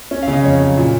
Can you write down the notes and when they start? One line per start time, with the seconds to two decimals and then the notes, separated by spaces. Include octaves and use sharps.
0.11 C#4
0.23 F5
0.28 C#3
0.33 D#5
0.44 F2 C#5
0.60 F#3
0.77 A#2